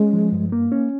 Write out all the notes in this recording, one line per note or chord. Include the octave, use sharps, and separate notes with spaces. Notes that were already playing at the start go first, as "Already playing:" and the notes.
Already playing: G#3 C#4
F3
G2
A#3
C#4